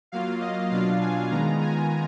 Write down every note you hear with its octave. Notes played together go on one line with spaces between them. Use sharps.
F#3 A#3 F4 F5
D#5
B2 F#3 D4 F4 F5
G#5
D#3 G#3 B3 F4 A#5
G#5